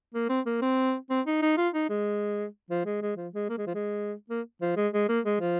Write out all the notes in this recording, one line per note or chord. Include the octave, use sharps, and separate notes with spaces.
A#3
C4
A#3
C4
C4
D#4
D#4
F4
D#4
G#3
F3
G#3
G#3
F3
G#3
A#3
G#3
F3
G#3
A#3
F3
G#3
G#3
A#3
G#3
F3